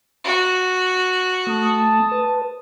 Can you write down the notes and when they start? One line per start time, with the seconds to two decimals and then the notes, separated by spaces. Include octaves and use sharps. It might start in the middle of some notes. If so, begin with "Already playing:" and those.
0.24 F#4
1.47 A3 A5 D#6
2.11 B4